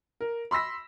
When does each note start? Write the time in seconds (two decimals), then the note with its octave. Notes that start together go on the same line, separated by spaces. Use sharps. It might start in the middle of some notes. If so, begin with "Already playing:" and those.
0.21 A#4
0.51 B5 C6 E6 A#6 B6